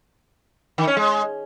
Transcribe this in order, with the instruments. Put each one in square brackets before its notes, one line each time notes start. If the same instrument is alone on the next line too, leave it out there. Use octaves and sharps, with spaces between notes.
[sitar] D#3
C#4
G#3